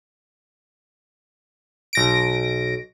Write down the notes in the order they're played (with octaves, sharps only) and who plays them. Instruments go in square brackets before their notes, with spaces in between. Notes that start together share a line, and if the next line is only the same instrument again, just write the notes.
[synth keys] B1 A#6 D7